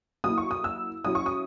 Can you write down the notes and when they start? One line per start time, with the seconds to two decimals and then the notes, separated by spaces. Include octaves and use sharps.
0.24 F#3 A#3 E4 D#6
0.38 C#6
0.51 D#6
0.64 E6
1.04 F#3 C#4 E4 D#6
1.15 C#6
1.26 D#6